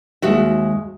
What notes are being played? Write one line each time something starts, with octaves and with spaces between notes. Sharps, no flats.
D#2 G#3 F#4 E5